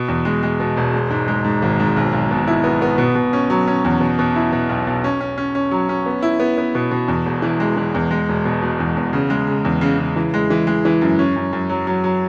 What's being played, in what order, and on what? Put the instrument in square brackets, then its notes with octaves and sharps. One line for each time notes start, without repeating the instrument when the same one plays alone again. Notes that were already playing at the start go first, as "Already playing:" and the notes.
Already playing: [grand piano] B2
E2
G#3
G#3
B2
E1
G#3
G#2
G#3
G#2
G#1
G#2
B1
B1
B2
E4
B3
B3
B2
B2
C#4
F#3
C#4
E2
B2
B2
E4
B2
B1
B1
C#4
C#4
C#4
C#4
F#3
C#4
B3
E4
B3
B3
B2
B2
E2
E1
E3
G#3
E3
E2
G#3
E1
B2
E1
E2
E2
C#3
G#3
C#3
E2
C#3
C#3
E3
G#3
E3
G#3
E3
F#2
C#4
F#2
F#2
F#3
F#3
F#3